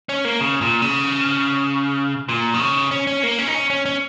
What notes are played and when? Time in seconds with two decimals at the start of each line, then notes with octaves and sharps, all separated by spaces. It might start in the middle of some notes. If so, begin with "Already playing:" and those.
0.09 C#4
0.25 A#3
0.41 C#3
0.61 A#2
0.82 C#3
2.29 A#2
2.54 D#3
2.60 C#3
2.91 C#4
3.07 C#4
3.23 A#3
3.39 C#4
3.47 D#4
3.54 C#4
3.70 C#4
3.86 C#4